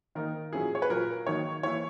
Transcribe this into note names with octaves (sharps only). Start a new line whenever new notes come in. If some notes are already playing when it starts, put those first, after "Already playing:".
D#3 A#3 D#4 A#4
A#2 F#3 C#4 E4 G#4
C#5
B4
A#2 F#3 A#3 A#4
D#3 F#3 A#3 D#4 C#5
E3 A#3 E4 C#5